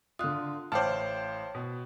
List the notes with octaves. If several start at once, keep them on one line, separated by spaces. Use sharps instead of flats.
D3 F4 D#6 F#6
A1 C5 C#5 F5 G5 A5 D6 F6
B2